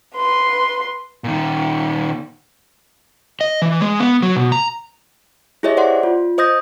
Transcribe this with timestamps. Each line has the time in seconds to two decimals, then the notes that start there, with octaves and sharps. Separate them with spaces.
0.17 B4 C6
1.24 A#2 D#3
3.41 D#5
3.62 E3
3.81 G#3
4.00 B3
4.22 F#3
4.36 B2
4.52 A#5
5.63 E4 G4 G#4 C#5 D#5 E5
5.77 C5 D5 F#5 C6
6.03 F4
6.38 C5 D#5 D#6 G6 A#6